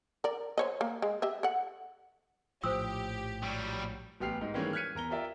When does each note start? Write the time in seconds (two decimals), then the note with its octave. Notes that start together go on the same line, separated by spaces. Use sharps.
0.24 A#4 D5
0.58 C5 C#5 D#5
0.81 A#3
1.02 G#3
1.22 G4 D#5 E5
1.43 A4 F#5
2.64 A#1 A2 F3 G4 C5 D#6 E6
3.43 F#3 G3
4.20 A1 B3 G4 F6 C7 F7
4.41 G#2 D#4
4.54 D#3 E3 G3 G#3 A#3 C#4
4.73 F6 F#6 G#6 B6 C#7 D#7
4.95 E2 A#4 A#5 G7
5.10 F4 G4 A#4 D5 E5